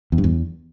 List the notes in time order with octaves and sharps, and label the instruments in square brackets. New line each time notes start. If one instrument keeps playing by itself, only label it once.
[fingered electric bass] E2
G2
E2